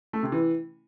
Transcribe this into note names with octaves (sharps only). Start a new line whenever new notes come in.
A3
C3
E3